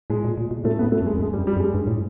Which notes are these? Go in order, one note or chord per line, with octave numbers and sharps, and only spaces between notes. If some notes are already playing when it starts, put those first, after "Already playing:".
A2 G#3
A#2
A#2
B2
A2 A3
B3
G#2
A3
F#2
G#3
F2
F#2 G#3
G3
F#2
G3
F#2
G#3
G2
A2